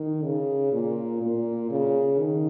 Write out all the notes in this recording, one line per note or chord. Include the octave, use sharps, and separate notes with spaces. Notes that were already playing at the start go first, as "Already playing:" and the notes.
Already playing: D#3
C#3
A#2
A#2
C#3
D#3